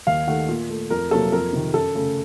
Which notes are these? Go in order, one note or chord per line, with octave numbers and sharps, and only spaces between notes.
D#2 F5
D#3 A3 F#5
A#2
A3
F2 A#4
C3 F#3 A#3 A4
F2 A#4
C3 D#3
F#2 A4
C#3 A3